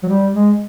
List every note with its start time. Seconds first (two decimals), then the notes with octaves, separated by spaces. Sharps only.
0.03 F#3
0.09 G3
0.33 G#3